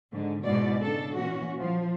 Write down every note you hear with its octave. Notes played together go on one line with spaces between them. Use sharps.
G#2 D3
G#2 B2 G#3 E4 D5
C#3 D4 A4
A#2 E3 C#4 F#4
F3